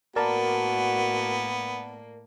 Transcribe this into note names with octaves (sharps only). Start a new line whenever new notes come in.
A2 A#3 B3 F#4 A#4 D5 A5